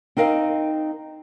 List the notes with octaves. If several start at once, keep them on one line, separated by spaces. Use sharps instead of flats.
C4 D#4 A#4 D#5 F5